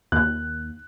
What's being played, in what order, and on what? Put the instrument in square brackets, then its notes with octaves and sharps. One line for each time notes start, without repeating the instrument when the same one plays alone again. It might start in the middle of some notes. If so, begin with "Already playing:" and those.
[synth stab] D#2 [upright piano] F#6